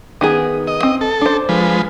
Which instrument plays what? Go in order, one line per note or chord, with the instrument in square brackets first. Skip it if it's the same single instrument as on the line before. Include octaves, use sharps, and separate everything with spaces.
[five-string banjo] D#3 B3 G#4
[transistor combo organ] D#5
[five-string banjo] C4
[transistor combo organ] A4
[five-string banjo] D4 C5
[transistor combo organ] F3 G#3 B4